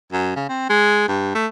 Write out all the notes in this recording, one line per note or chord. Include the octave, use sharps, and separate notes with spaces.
F#2
C#3
C4
G#3
G2
A3